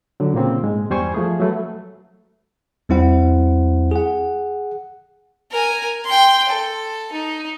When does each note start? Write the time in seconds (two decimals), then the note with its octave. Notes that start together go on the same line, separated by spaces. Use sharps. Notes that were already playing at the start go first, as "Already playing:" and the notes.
0.20 D3 F#3
0.34 A#2 C#3 A#3 C4
0.63 G#2 G#3
0.90 E2 G2 G3 C5 G#5 C#6
1.14 F3 A3 G#4
1.40 F#3 A3 B4
2.89 E2 G3 C4 E4 C5 F#5
3.91 G#4 F#5
5.51 A#4 G#5
6.05 G5 C6
6.49 A4
7.12 D#4